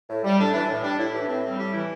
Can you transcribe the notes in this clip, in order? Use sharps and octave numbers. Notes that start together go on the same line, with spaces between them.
A2
G3
A2 D4
E3 D4
A2
G3 D4
A2 E4
E3 G4
D4
A2 C4
G3 C4
A2 G4
E3 E4